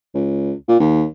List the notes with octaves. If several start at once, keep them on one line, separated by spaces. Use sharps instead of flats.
C#2
A#2
D#2